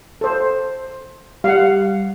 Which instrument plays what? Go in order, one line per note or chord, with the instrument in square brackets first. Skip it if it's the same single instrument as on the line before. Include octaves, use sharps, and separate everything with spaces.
[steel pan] A4 C5
[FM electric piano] G3 [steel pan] F5 F#5